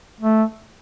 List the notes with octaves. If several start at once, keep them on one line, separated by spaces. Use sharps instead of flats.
A3